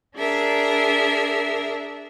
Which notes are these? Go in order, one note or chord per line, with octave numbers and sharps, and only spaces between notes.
D4 G#4 A#4 E5